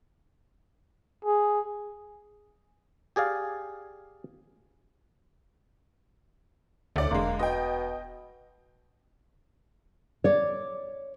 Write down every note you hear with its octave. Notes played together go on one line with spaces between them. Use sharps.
G#4
G4 G#4 D5 F5
D2 A2 A3 D5
E1 D3 G#3 A#3
B2 D#5 G5
C#5 D5